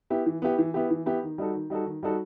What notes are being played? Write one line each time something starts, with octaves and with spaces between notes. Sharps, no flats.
B3 E4 G4
E3
B3 E4 G4
E3
B3 E4 G4
E3
B3 E4 G4
D#3
G3 D#4 F#4 A4
D#3
G3 D#4 F#4 A4
D#3
G3 D#4 F#4 A4